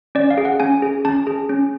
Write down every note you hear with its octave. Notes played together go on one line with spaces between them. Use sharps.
C#4 D5
F5
G#4
F#5
C#4 G#5
G#4
C#4 A5
G#4
C#4